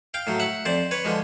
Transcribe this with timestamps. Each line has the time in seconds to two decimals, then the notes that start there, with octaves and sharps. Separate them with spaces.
0.14 F5 G5
0.27 A2 F#3
0.40 E5 F#5
0.65 F2 C5 D5
0.91 B4 C#5
1.05 D3 F3 G#3